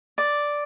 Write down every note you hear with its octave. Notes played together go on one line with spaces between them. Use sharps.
D5